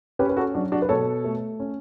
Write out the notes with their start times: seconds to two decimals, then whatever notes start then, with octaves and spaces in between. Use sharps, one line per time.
0.19 C#4 G4 B4
0.29 B4
0.37 F#4 A4
0.55 F#3 D4 F#4
0.72 D4 F#4
0.82 B4
0.89 B2 A4 C#5
1.24 A3
1.60 C#4